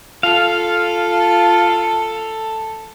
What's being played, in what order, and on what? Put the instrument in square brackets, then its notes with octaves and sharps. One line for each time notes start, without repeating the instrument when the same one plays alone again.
[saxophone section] F4 [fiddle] A4 [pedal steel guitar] F5